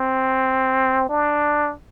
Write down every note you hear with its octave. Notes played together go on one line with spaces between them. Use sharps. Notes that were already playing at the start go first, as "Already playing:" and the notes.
Already playing: C4
D4